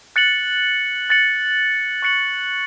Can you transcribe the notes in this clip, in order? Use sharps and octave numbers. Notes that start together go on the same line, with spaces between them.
F#6 A6 C#7 F#7
F#6 A6 C#7 F#7
C#6 F#6 C#7 F#7